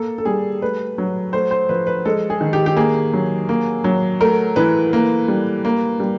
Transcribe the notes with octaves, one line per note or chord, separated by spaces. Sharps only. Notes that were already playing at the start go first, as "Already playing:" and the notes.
Already playing: A#3 A4
A4
G3 G#4
A3 B4
F#3
A3 C5
C5
F3 B4
B4
G#3 A4
G#4
D#3
G4
G4
A#3 G#4
F#3
A#3
F#3
A3 A#4
E3 B4
A#3
G3
A#3
G3